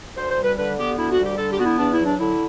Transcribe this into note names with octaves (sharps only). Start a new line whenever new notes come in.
D2 C5
C5
G3
B4
D3 B4
B3 G4
D2 E4
F#4
G3
G4
D3 A4
G4
B3 F#4
E4
E2 D4
E4
F#3
D4
D3 E4